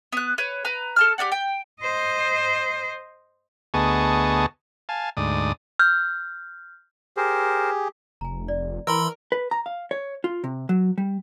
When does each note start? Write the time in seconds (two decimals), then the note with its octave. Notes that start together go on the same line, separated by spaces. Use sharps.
0.12 B3 F#6
0.38 B4 C#5
0.65 B4 A#5
0.96 A4 A5 F6
1.18 G4 B4 D5 F#5
1.32 G5
1.81 C5 D#5
3.74 D2 B3 G#4 D#5 A5 C#6
4.89 F5 G#5 A5
5.17 D2 G#2 D5 D#6
5.79 F6 G6
7.17 G4 G#4 A#4 C5
8.21 F1 G#5 A#5
8.48 D5
8.87 E3 A#4 B5 C6 E6
9.32 B4
9.51 A#5
9.66 F5
9.91 C#5
10.24 F4
10.44 C3
10.69 F#3
10.98 G3